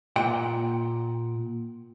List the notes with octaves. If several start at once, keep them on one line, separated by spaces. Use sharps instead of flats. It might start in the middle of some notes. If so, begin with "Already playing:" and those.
A#2 F#5 G5